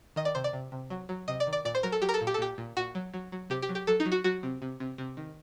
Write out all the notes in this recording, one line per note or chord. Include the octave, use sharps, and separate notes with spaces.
D#3 D#5
D5
C3 C5
D5
C3
C3
F#3
F#3
C3 D#5
D5
D#3
D5
A#2 D5
C5
F#3 A#4
A4
F#3 G4
A#4
A4
A#2
G4
A4
A#2 G4
A#2
A#2 F#4
F#3
F#3
F#3
C3 G4
G4
F#3
G4
F#3 A4
D#4
F#3
F#4
F#3 F#4
C3
C3
C3
C3
D#3